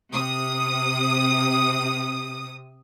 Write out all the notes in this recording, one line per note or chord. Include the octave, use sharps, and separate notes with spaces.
C3 D#6